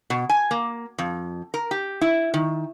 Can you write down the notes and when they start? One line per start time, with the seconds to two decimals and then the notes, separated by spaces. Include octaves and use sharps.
0.10 B2
0.29 G#5
0.51 A#3
0.98 F2
1.54 A#4
1.71 G4
2.01 E4
2.34 D#3